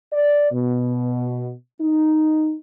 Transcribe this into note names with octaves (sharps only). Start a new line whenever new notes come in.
D5
B2
D#4